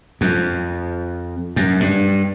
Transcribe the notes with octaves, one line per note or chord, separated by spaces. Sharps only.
F2
F#2
G2